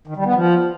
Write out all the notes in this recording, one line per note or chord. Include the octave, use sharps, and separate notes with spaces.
D#3
G3
B3
F3